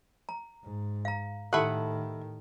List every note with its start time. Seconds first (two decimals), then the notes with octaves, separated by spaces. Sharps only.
0.29 A#5
0.64 G#2
1.05 F5 A#5
1.53 A2 D#3 E4 G4 A4 F#5 A5